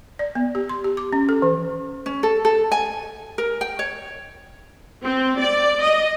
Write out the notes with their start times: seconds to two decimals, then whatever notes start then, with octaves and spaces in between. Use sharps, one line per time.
0.19 D5
0.35 B3
0.55 G4
0.69 C6
0.84 G4
0.97 D6
1.13 C#4
1.29 A4
1.42 E3
2.06 C#4
2.23 A4
2.45 A4
2.72 G#5
3.38 A#4
3.61 G5
3.79 C#5
5.01 C4
5.37 D5
5.81 D#5